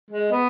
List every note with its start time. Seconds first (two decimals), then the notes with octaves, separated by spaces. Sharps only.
0.10 G#3
0.32 B3